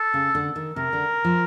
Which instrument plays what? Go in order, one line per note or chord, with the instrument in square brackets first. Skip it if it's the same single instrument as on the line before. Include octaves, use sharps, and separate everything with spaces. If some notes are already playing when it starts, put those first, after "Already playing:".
Already playing: [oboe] A4
[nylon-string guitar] C#3
D3
D#3
[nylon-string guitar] C3 [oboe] A#4
[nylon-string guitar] D3
F3